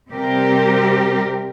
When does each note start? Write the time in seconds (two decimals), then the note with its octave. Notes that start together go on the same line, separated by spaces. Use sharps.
0.11 C3 G3 C4 G4 A#4